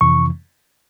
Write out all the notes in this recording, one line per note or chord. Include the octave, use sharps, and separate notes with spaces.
F2 C3 E3 C#6